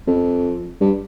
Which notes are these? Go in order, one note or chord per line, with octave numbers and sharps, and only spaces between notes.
F2
G2